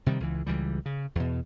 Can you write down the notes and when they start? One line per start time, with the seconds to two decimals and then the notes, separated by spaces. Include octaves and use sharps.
0.06 C3 D#3 G3
0.20 C#2 E3
0.46 C#2 E3 G3
0.86 C#3
1.15 E2 B2